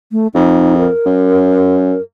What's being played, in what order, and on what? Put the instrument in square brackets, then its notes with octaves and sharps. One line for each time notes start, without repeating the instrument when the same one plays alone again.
[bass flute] A3
[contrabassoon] F2 [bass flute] D#4
[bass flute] A#4
[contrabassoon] F#2